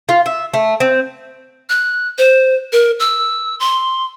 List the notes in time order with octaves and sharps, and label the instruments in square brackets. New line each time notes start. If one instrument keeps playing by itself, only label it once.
[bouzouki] F4
E5
A3
C4
[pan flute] F#6
C5
A#4
E6
C6